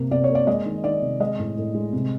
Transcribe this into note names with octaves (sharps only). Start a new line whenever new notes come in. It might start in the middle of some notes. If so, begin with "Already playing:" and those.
Already playing: C3 A#3
C3 D5
C#5
A#3
D5
G#3 D#5
D#3
D#3 D5
C3
G#3 D#5
A2
A2
G#3
C3